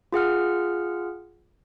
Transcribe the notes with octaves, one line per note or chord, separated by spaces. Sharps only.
F4 G#4 F#5 F6